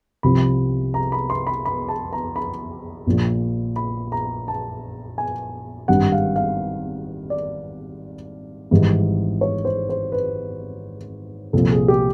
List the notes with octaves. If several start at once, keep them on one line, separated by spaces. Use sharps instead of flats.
C2 C3 F3 B5
A#5
B5
C6
B5
B5
A5
A#5
B5
A#1 A#2 F3
B5
A#5
A5
G#5
G#1 G2 D#3 G3 F#5
F5
F5
D5
G#1 G#2 E3 G3
C#5
C5
C5
B4
C2 A#2 F3 A4
G#4
G4